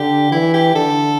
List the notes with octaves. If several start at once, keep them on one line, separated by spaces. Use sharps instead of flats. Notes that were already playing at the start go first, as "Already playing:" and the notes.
Already playing: D3 G4
E3 E4
G4
D3 A4